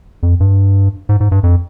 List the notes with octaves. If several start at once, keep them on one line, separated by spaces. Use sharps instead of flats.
F2
G2
G#2
G#2
G2
F2